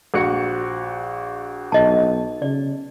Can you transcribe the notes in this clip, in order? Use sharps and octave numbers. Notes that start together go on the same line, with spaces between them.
A#1 F#4 C#7
B1 D#5 A5
C#3 D5